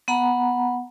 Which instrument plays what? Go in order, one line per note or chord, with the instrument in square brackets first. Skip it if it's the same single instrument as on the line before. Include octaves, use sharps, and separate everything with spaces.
[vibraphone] B3 F#5 A#5 B5